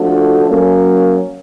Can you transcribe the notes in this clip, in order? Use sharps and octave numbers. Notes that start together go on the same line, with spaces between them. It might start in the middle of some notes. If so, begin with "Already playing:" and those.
Already playing: F3 A3 D4 F#4 A4
F#3 A#3 C#4